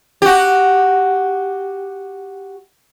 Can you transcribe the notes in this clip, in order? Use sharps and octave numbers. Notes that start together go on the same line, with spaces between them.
F#4 G4